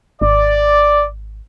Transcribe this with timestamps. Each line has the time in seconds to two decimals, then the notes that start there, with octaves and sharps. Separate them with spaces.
0.21 G#1 D5